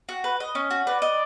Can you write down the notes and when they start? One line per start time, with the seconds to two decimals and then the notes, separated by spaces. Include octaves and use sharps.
0.09 F#4
0.24 B4
0.40 D#5
0.55 C#4
0.71 F#4
0.87 B4 D5
1.02 D#5